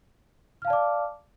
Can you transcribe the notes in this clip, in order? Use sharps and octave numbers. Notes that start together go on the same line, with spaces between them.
D5 F5 A5 D6 F6